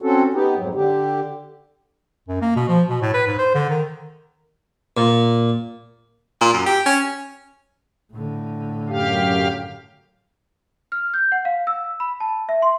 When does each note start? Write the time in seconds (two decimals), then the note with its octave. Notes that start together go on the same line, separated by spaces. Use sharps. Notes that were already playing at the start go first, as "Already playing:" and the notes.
0.02 C4 C#4 F#4 A4
0.34 B3 D#4 G4
0.56 F2 G#2 F#3
0.75 D3 G4
2.28 F#2
2.42 A#3
2.56 B2
2.68 F3
2.89 B2
3.02 A2
3.14 B4
3.27 G#2
3.39 C5
3.55 D3
3.70 D#3
4.97 A#2
6.41 A#2
6.54 F#2
6.66 G4
6.86 C#4
8.13 A2 D3
8.88 F#2 G4 F5
10.92 F6
11.14 G6
11.32 F#5
11.45 F5
11.67 E6
12.00 B5
12.20 A5
12.49 E5
12.62 C6